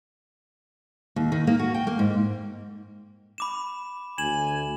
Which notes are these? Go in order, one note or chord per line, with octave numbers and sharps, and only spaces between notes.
D#2
D#3
A#3
F#4
G5
A#3
G#2
B5 D6 E7
D2 G#5 E7 F#7